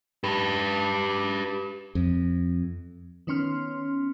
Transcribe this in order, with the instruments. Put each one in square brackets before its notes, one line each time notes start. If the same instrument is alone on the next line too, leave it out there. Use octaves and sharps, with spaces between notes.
[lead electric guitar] G4 B4
[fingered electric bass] F2
[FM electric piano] D#3 B3 C#4 C6 F6